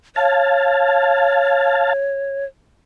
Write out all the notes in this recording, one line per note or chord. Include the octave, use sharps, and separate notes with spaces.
C#5 F5 A5